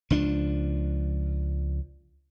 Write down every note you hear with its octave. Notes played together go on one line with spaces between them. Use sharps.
C#2 F3 D4